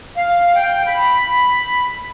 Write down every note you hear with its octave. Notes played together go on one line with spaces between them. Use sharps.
F5
G5
B5